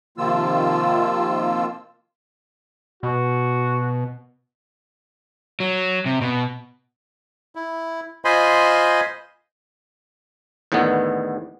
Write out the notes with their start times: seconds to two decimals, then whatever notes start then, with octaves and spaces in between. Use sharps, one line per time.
0.18 C3 D#3 F3 A#3 F4 E6
3.03 B2 F#4
5.60 F#3
6.06 C3
6.21 B2
7.55 E4
8.25 F4 C5 D#5 G#5 B5 C6
10.72 E2 A2 D3 D#3 B3